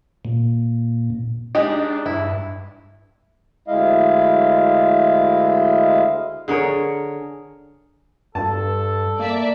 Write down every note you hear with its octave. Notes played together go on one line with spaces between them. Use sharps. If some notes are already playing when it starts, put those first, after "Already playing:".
A#2
G#3 D4 D#4 G4
G2 E4
D2 G#3 E4 D#5 F5
D3 G#4 A#4 C#5
G2 A4 A5
A#3 D5 E5